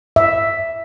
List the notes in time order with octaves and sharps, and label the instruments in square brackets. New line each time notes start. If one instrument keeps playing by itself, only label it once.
[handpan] E5